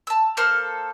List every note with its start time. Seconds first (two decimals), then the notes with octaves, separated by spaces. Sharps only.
0.07 A5 E6
0.37 A#3 A4 C5 F6